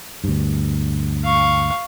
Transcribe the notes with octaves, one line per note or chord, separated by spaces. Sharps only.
D2 G2
F5 C#6